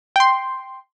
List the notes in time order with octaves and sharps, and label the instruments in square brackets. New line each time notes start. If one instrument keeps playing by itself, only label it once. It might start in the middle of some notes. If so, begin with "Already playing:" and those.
[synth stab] G5 C6